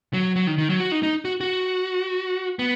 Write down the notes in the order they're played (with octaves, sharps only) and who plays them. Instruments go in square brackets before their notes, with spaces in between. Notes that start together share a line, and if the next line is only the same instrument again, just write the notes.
[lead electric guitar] F#3
F#3
D#3
D#3
F#3
F#4
D#4
D#4
F#4
F#4
B3